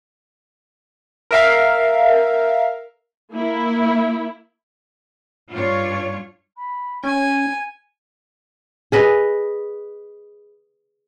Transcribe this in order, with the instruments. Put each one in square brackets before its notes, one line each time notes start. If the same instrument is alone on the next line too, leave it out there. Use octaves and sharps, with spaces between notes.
[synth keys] A#4 E5 F5
[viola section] A#3 E4
[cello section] G2 D4 F4 C#5
[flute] B5
[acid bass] C#4 [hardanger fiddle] G#5 [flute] G#6
[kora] G#4 B4 D#5